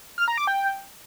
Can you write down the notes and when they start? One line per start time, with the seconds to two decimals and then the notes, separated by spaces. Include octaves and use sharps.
0.18 F6
0.28 A#5
0.38 D6
0.47 G5